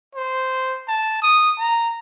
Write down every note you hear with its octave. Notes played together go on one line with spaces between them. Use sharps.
C5
A5
D#6
A#5